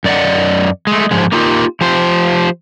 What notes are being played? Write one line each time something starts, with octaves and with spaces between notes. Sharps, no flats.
F#2 D5 D#5 F#5
G#3 A3
G#2 F3 G#3
A#3 D#4 F4 G4
F3 G4 C5